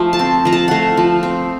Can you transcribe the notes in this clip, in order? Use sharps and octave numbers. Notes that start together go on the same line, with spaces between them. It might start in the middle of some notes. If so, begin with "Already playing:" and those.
Already playing: F3 A3
A5
C4
F3 A#5
A5
A3 F5 F#5
F3
C4